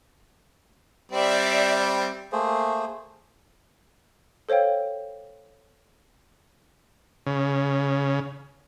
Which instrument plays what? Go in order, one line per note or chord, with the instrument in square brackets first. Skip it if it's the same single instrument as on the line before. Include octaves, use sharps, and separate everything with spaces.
[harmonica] G3 C4 [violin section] D5 E5
[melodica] A3 A#3 G#4 C5
[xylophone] A4 C5 C#5 F5 G5
[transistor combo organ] C#3